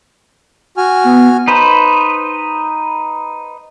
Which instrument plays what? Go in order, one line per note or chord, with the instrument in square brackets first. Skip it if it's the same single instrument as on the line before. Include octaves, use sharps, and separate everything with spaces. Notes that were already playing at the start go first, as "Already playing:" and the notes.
[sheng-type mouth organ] F#4 G#5 F6
[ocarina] B3
[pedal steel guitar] D#4 B4 C5